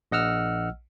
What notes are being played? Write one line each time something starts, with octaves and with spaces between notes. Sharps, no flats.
A#1 D#5 F#5 E6 F6